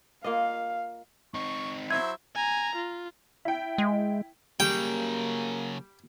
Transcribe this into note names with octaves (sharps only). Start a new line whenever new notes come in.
A#3 F4 D#5 F5
C4 D#4 C#6
F#3 E4 C5 E5 G#6
G#5 A#5
F4
E4 G5
G#3
C#3 F#3 G3 A#3 G5